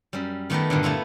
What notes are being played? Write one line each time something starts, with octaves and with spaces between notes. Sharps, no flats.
F#2 G3
D#3 A3 B3 G4 A#4 B4
G2 A#2 D3
A3 B3 E4 F4